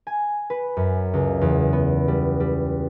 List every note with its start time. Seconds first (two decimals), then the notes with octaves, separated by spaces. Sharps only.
0.07 G#5
0.50 B4
0.77 F#2
1.13 C#2
1.41 E2
1.73 B3
2.08 G3
2.40 G3